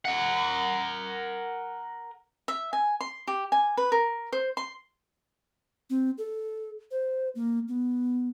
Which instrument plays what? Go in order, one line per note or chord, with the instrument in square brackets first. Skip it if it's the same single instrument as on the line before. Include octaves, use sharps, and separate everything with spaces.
[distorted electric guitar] A#4 F#5
[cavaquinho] E5
G#5
C6
G4
G#5
B4
A#4
C5
C6
[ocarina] C4
A4
C5
A#3
B3